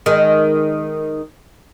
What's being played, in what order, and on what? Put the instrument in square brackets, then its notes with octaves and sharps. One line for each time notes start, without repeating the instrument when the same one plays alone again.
[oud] D#3 G#3